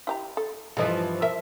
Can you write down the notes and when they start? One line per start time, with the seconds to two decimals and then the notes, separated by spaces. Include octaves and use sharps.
0.07 E4 G4 A#5
0.37 A4
0.77 G2 E3 F3 G#4 A4 D#5
1.22 A#4 E5